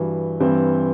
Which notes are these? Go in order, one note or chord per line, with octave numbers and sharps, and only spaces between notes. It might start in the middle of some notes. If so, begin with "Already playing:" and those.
Already playing: G2 E3 F#4
G2 E3 C4